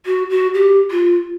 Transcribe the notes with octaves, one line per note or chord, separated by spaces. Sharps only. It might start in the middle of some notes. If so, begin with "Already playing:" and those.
F#4
F#4
G4
F4